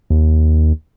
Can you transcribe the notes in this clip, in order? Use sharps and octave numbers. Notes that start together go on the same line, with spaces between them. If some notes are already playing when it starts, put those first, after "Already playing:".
D#2